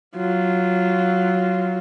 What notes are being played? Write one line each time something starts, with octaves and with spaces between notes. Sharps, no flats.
F#3 F4